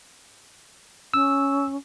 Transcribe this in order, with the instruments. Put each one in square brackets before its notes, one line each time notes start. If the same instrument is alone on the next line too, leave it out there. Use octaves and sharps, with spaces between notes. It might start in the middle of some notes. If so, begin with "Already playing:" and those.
[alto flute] C#4 [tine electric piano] E6